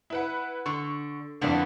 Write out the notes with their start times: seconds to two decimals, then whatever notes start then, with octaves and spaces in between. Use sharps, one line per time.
0.10 E4 B4 F#5
0.66 D3 C#6
1.41 F2 A2 D3 A#3 B3 D4